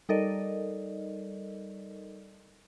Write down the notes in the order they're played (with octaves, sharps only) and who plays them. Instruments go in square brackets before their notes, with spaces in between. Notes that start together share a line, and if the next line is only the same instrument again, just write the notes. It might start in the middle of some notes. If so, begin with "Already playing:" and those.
[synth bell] G3 D#4 A4 A#4 D5 D#5